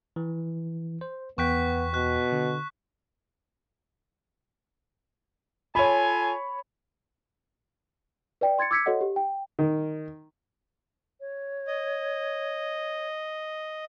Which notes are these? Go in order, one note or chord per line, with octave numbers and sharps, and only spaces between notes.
E3
C5
E2 B3 G5 C#6 F#6 B6
B2 F#6
D3
F4 A4 C#5 G#5 B5
B4 D5 G5
C6 G#6 A6 C#7
D6 E6 G#6 B6 C#7
F#4 A4 C#5 D#5 F#5
G4
G5
D#3
C#5
D#5